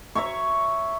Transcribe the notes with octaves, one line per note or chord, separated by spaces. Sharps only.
C#5 E5 A#5 C#6